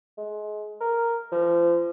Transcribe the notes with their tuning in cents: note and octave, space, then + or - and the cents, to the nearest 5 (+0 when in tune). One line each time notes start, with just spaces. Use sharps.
G#3 +30
A#4 +0
F3 -30